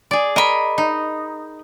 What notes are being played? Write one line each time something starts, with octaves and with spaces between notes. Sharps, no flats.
G#4 D5
A#4 D#5 B5
D#4